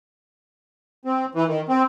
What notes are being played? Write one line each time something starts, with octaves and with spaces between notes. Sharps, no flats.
C4
E3
D#3
C4